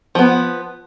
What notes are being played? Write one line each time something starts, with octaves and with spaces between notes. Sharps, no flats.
F3 B3